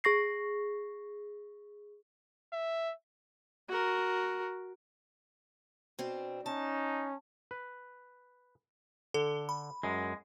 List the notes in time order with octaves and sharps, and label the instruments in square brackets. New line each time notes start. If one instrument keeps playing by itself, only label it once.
[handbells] G#4 C#6 A#6 C7
[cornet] E5
[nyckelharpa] F#4 A#4
[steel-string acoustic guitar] B2 C4 D4
[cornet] C#4 [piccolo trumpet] D#4 [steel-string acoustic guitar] A5
[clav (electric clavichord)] B4
[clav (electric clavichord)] D3 [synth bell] A4
[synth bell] B5
[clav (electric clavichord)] F#2 [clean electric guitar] G#3